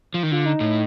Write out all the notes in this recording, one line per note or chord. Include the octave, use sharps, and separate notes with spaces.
F3
D#3
D3 F4
D#4
A2